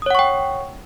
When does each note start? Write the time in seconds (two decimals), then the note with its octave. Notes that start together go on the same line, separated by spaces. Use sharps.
0.02 D#6
0.06 C#5
0.10 F#5
0.15 C#6
0.19 G5